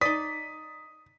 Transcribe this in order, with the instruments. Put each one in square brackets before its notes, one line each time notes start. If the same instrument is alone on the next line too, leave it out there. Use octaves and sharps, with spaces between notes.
[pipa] D#4 D5 [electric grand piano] D#6 B6